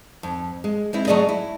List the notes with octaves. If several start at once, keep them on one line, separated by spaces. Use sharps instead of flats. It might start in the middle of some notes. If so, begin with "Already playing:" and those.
F2
G#3
G#3 C4 E4
F#3 G3 A3 G#4 D5 D#5
E4